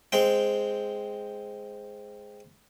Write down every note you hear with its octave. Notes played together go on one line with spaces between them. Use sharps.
G#3 C4 G5